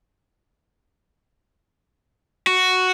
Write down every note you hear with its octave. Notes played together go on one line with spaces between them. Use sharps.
F#4